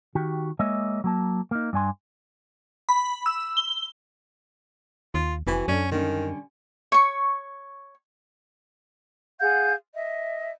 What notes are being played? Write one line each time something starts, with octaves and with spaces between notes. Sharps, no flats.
D#3 F#4 G4
G#3 A#3 C#5 D#5 E5
F#3 A#3 A5
A#3 D#4
G2 D4 G#5 C6
B5
E6
G7
D#2 F4
F1 E3 C4 F#4 G#5
F#2 C#4 D4 A4 D5
D3 D#3 G3 C#4
C#5 C#6
G#4 F5 F#5 G6
D#5 E5